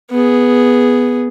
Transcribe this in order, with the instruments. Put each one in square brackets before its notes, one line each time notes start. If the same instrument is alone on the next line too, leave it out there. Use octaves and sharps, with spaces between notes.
[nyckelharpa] B3 G#4